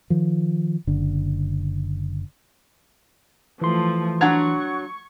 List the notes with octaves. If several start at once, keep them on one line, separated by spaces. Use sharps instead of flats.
D#3 F3
F#1 D3
E3 F3 A3 C6
F#3 D4 F#5 A#5 C#6 G#6